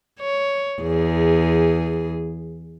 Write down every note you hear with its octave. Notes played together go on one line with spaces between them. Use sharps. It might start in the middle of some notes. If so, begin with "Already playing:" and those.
C#5
E2 G#4